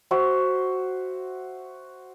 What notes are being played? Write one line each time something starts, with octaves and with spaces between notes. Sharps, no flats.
F#4 C5 E5